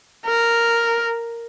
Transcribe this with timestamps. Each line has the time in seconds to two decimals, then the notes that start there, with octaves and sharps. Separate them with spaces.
0.26 A#4